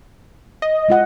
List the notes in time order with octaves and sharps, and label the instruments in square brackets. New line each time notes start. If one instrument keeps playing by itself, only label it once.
[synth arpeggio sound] D#5
[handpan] G#3 F4 F#5